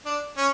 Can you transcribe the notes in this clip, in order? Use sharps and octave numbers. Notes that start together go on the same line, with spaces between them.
D4
C#4